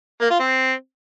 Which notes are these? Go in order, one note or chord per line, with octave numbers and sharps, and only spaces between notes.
A#3
F4
C4